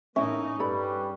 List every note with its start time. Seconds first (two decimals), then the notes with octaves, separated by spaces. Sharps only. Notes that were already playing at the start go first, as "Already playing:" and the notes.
0.16 E2 A2 A3 A#3 C#4 D#4 E4 E5
0.59 G2 G3 A4 B4 D5 B5